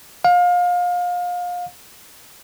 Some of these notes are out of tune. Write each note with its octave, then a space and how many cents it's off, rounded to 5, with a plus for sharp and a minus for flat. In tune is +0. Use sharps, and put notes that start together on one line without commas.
F5 +30